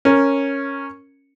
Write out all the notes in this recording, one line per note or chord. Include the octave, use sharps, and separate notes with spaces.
C#4 A#4